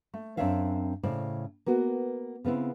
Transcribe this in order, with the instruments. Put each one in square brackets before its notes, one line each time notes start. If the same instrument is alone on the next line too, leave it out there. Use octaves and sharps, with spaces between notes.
[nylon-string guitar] A3
F#2 C4 D4 C#5 E5 F5
A2 C#3 C5 D5
A#3 B3 F#4 A#4
C#3 B3 C4 E4